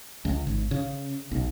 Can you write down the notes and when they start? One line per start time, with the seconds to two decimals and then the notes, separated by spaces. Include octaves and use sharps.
0.25 C#2
0.47 G#1
0.71 C#3
1.31 B1